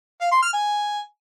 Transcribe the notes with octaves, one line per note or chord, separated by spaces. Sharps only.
F5
C6
F6
G#5